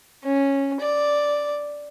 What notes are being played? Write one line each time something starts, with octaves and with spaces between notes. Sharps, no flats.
C#4
D5